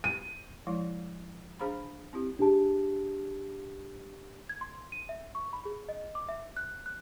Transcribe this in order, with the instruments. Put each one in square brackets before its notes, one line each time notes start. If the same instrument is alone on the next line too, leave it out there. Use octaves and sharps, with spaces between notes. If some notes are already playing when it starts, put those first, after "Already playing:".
[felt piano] D#7
[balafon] F3 G#3 E4 C#5
D4 G#4 C5 F5 A#5 B5
C4 E4 G4
[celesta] D4 G4 G#4 A5
G#6
C6
D#7
E5
C#6
B5
G#4
D#5
D6
E5
F#6
F#6